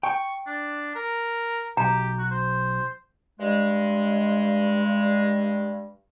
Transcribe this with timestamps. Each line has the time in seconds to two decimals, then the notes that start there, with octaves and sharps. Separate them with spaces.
0.03 G5 C#6
0.47 D4
0.95 A#4
1.77 B1 G4 A#5
2.19 F#4
2.31 C5
3.40 G2 G#3